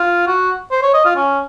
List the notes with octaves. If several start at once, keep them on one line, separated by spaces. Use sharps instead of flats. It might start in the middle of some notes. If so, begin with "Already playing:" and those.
Already playing: F4
F#4
C5
C#5
D#5
F4
C#4